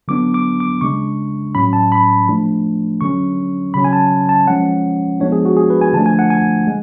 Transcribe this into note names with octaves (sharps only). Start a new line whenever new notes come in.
D3 F#3 B3 D4 D6
D6
D6
C#3 G#3 D4 C#6
A2 F#3 C#4 B5
A5
B5
F3 A3 D4
D3 F#3 C#4 C#6
C#3 F#3 C#4 B5
G#5
A5
A5
F3 G#3 C#4 F#5
F3 G#3 B3 D4 C#5
G#4
F#4
G#4
B4
G#5
D3 F3 A3 D4 A5
G#5
F#5
G#5
G#3